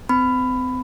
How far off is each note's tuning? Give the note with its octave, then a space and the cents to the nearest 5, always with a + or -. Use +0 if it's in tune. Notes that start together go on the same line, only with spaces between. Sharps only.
C4 -35 B5 +15